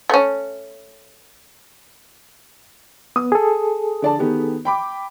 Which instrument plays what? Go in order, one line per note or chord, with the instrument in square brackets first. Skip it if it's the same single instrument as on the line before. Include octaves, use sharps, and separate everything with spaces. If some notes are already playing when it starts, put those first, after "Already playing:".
[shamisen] A3 C#4
[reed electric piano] B3 [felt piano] D#6
[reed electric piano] G#4 A4
[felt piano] D3 D5 A5
D#3 B3 G4
G5 B5 D6